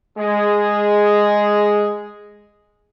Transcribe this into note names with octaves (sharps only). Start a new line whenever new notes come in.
G#3 G#4